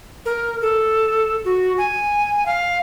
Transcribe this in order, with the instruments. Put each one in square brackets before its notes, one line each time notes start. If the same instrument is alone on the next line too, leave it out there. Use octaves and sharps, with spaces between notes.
[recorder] A#4
A4
F#4
G#5
F5